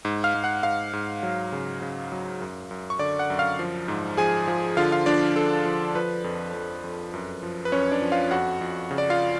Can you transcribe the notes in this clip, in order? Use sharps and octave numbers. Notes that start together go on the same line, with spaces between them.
G#2
F5 F6
G#2
F#5 F#6
G#2 F5 F6
G#2
F#3
C#3
C#3
F#3
F#2
F#2
C#6
D3 D5 D6
F#5 F#6
F#2
F5 F6
F3
G#2
F3 G#4 G#5
F3
D3 F4 F5
F4 F5
F3 D4 D5
F3 A4
F3
F3 B4
F2
F2
F2
F#2
F3
B4
F#2 C#4 C#5
D4 D5
F3
F4 F5
F2 F#4 F#5
F2
C#3
D5
F4 F5